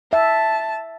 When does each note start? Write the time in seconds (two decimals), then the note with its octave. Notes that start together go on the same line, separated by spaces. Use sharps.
0.13 E5 A5